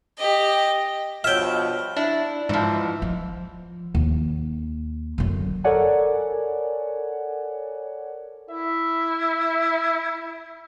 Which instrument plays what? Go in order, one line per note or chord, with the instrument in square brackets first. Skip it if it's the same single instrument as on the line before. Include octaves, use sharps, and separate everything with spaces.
[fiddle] G4 D#5
[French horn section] G2 B2 F3 [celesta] C#5 D#5 F6 [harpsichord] E5 G5
[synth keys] D4 [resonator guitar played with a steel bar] E4
[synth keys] G#2 [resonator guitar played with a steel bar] E3 F3
[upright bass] F3
D#2
F#2 D3
[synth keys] A4 A#4 C#5 D5 F#5 G#5
[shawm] E4 [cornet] E5